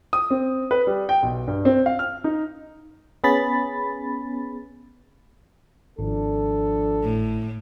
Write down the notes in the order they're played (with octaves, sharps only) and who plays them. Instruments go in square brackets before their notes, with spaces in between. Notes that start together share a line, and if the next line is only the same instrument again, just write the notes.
[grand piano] D#6
C4
B4
G3
G5
B1
G2
C4
F5
F6
D#4
[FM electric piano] B3 C#4 G#4 B5 A6
[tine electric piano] G#1 [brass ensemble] F3 D4 [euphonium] A4
[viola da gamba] A2